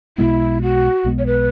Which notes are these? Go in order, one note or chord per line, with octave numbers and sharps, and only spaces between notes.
B1 B2 G#3 B3 E4
F#4
B1 B2 G#3 B3
C#5
B4